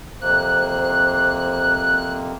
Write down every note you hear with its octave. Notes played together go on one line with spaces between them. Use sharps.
F2 C3 A#3 C5 F#6